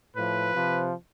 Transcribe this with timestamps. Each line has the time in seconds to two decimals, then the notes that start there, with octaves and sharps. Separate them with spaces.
0.15 A2 F3 B4
0.54 C3 F3